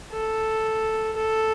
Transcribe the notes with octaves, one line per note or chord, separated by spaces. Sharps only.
A4
A4